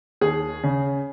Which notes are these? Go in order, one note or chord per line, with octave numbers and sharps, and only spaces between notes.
D#2 G#4
C#3